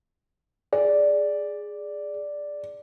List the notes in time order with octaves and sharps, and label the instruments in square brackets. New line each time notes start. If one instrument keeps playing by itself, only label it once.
[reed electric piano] G#4 [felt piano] D5